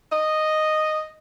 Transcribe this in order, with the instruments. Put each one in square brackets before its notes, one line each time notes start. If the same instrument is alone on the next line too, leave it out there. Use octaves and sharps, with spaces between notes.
[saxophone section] D#5